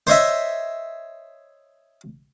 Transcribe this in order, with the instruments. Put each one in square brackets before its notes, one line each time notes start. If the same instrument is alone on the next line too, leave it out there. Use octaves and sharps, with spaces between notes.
[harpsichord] C5 C#5 D#5 E5